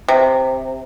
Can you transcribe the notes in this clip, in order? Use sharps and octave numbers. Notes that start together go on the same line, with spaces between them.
C3